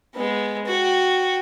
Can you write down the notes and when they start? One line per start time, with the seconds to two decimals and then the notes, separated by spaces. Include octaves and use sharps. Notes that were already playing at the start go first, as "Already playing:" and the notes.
0.15 G#3 B3
0.66 F#4 G5